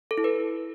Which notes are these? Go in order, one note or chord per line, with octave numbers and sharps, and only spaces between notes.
A4
E4
B4